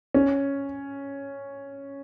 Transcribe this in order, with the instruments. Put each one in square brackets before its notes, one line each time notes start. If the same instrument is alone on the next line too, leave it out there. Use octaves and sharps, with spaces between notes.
[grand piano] C#4